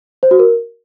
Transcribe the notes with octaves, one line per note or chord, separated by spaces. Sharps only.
C5
F#4
A#4